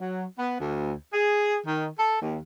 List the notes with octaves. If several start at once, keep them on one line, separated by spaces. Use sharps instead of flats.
F#3
B3
D2
G#4
D#3
A4
D#2